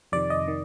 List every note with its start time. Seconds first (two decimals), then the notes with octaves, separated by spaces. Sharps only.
0.12 F2 C3 D#3 D5
0.30 D#5
0.48 D#3